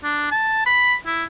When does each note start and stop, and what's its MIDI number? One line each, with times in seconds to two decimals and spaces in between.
0.04 0.29 62
0.32 0.64 81
0.66 0.95 83
1.06 1.24 64